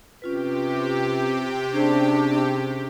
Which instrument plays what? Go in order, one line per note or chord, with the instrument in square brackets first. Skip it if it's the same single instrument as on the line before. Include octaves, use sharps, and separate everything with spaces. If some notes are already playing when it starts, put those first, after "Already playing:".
[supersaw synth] C3 G4 [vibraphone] C#4 F4 B4
[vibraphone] C#4 G#4 C5 [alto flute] D4